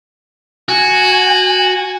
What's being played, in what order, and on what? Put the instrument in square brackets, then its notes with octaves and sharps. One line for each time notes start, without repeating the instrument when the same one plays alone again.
[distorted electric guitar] F#4 [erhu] G#5